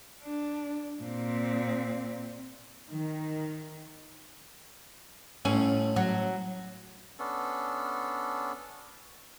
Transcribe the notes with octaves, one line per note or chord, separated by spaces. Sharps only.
D4
A#2 C4
D#3
A1 A2 C#4
F#3
B3 C#4 D4 A4